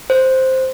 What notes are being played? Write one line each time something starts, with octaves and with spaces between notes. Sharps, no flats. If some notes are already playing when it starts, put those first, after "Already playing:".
C5